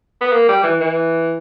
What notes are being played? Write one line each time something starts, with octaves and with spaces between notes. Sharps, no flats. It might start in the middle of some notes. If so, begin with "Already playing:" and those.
B3
A#3
G3
E3
E3